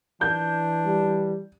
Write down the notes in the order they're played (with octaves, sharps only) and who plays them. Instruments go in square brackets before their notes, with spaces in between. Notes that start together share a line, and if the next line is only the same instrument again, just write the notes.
[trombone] E3 [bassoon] D4 [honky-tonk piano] G6
[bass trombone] G3